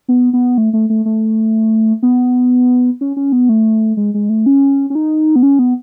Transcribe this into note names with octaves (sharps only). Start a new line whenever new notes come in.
B3
B3
A3
A3
A3
A3
B3
C#4
C#4
B3
A3
G#3
G#3
A3
C#4
C#4
D#4
B3
C#4
B3